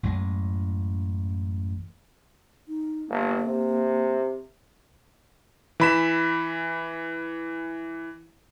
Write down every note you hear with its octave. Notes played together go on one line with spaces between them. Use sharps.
A1 F#2 E3 G#3
D#4
G1 A#3
C3
E3 B5 E7